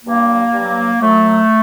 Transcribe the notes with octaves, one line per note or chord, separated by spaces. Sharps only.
G2 F#3 A#3
G2 F#3
F#2 F#3 A3